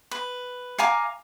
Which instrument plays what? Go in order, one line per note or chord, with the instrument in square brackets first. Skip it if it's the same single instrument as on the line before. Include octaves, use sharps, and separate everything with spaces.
[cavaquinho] B4
F5 G#5 A#5 D6